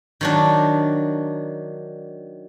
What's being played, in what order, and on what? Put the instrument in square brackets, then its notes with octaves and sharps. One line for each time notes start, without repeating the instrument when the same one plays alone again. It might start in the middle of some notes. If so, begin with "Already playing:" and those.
[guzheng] D#3 F#3 D4